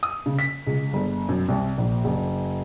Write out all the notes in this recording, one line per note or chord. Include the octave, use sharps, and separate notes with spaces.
D#6
C#3
B6
C#2
G1
F#2
C2
A#1
F#1